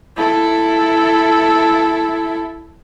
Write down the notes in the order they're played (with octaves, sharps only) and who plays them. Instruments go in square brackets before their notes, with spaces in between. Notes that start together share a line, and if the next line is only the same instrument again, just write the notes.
[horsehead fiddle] E4 A4